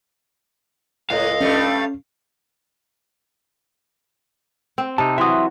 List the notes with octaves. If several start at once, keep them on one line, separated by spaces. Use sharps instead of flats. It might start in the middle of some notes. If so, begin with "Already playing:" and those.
C#2 A2 A4 D#5 F5
G2 G3 A3 C#4
C4
C3 D#4 A5
E3 F#3 E5 C6 D#6